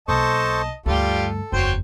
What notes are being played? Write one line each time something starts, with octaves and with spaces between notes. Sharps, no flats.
B1 A#3 A4 C5 D#5 A5 C#6
D2 G2 G3 F4 G4 A4
F#1 E2 F#3 C5 G5